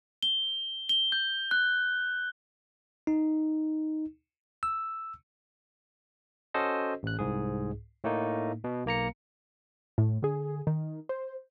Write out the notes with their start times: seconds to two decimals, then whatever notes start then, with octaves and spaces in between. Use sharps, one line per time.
0.23 G7
0.89 G7
1.12 G6
1.51 F#6
3.07 D#4
4.63 E6
6.54 C#4 F#4 A4 C5 D#5
7.03 A1 F#6
7.19 C2 G#2 G#4
8.04 A2 A3 A#3 D#4
8.64 B2
8.85 B1 A#3 A#5 C#7
9.98 A2
10.22 D3 G#4
10.67 D#3
11.09 C5